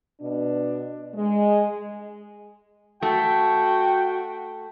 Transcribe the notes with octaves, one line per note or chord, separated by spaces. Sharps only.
B2 D4
G#3
A3 F#4 G5